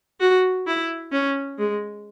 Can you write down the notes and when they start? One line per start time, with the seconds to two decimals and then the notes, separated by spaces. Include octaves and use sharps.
0.20 F#4
0.67 E4
1.12 C#4
1.58 G#3